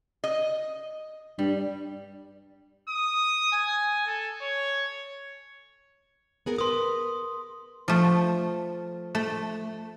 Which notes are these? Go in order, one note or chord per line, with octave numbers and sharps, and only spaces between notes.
D#5
G2 G3
D#6
G#5
A4
C#5
B3 G#4 A#4
A#4 B4 C6 D#6
F3 A3
A3